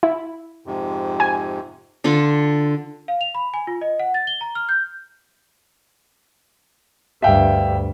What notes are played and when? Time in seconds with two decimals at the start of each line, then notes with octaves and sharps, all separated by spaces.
0.03 E4
0.66 F2 G#2 C3
1.20 G#5
2.04 D3 D4 F4 A4
3.08 F5
3.21 F7
3.35 B5
3.54 G#5
3.67 F4
3.81 D#5
4.00 F#5
4.14 A6
4.27 G7
4.41 A#5
4.55 F6
4.69 G6
7.22 D2 G2 E5 F5 G5